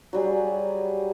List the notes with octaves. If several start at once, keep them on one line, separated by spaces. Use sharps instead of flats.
F#3 G3 G#4